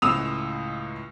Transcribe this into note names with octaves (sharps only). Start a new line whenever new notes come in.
C#2 A2 G#3 D#6 E6 F7